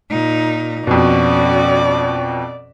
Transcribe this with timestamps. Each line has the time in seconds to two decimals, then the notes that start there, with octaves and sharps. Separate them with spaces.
0.10 A#2 D#4
0.87 F2 B2 C#4 F#4 D5